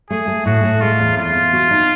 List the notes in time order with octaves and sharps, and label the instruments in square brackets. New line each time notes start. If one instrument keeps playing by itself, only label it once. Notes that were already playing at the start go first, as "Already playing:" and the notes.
[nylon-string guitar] A3 [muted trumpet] G#4
[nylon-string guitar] A3
[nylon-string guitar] A2 [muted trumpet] F#4
[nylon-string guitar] A2
[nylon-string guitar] G#3 [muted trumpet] F4
[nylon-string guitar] E2
[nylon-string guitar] E2 [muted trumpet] F4
[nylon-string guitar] E2
F#4
D#4